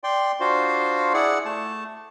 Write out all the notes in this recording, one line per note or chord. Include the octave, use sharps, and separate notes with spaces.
D5 G5 C6
D4 F4 F#4 C5 F5
E4 G#4 D5 F#5
A3 A5